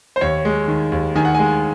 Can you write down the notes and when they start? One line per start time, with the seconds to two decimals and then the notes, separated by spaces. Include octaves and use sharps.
0.16 C5
0.21 D#2 C#5
0.45 G#3
0.68 D#3
0.92 D#2
1.15 D#3 G#5
1.25 F#5
1.34 G#3 G#5